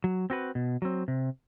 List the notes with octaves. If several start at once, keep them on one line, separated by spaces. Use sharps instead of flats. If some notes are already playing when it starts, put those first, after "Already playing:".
F#3
C4 F#4 B4
B2
F#3 C4
C3